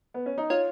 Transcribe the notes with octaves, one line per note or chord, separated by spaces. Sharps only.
B3
C#4
D#4
F4 C#5